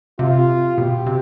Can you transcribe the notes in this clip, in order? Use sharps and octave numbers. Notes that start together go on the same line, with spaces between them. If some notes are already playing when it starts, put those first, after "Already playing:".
C3 F4
B2 G4
C3